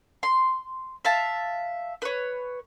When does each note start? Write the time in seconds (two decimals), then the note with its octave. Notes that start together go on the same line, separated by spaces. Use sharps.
0.23 C6
1.05 E5 F5 A5
2.02 B4 C#5